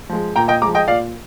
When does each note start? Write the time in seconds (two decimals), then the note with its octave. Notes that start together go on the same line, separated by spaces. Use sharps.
0.09 F3 G#3
0.36 A#2 G5 A#5
0.48 D#5 G5
0.62 F3 G#3 A#5 D6
0.75 D#5 G5
0.88 A#2 D5 F5